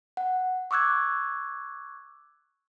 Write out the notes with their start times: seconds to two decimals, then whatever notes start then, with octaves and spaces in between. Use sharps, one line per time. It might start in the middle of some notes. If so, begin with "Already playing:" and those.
0.17 F#5
0.71 C#6 D6 E6 F#6 G#6